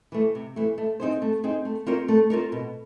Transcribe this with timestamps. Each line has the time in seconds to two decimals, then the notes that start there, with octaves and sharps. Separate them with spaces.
0.12 E3 A3
0.35 C3
0.56 E3 A3
0.78 A3
1.00 C4 D#4 G#4 C5
1.22 A3
1.44 C4 D#4 G#4 C5
1.65 A3
1.87 C4 F4 A#4 C#5
2.08 A3
2.30 C4 F4 A#4 C#5
2.52 B2